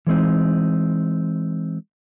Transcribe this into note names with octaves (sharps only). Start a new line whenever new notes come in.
E3 G#3 C4 D#4